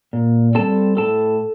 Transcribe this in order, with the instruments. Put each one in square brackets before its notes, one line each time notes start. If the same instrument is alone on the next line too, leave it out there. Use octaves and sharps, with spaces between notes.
[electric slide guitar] A#2
G3 C4 A4 A5
A2 A4 A5